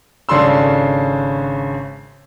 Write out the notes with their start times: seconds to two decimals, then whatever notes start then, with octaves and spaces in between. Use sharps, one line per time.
0.29 G#1 C#3 D4 A4 C6 E6